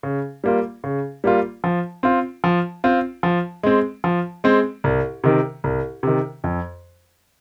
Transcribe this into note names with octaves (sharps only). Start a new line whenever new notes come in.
C#3
G3 A#3 F4
C#3
G3 A#3 F4
F3
C4 F4
F3
C4 F4
F3
G#3 C4
F3
G#3 C4
C2
C3 D#3
C2
C3 D#3
F2